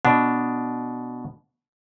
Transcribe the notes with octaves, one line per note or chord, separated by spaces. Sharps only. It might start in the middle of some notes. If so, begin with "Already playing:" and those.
B2 D4